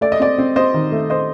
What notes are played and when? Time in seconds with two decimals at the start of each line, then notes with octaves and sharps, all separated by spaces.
0.01 A3 D5
0.12 D#5
0.20 C4 D5
0.38 C4
0.56 C4 C5 D#5
0.74 D#3
0.92 A3
1.10 C5 D#5